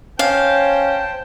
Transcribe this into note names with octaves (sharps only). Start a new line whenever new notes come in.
C#4 C5 F5 G5 A5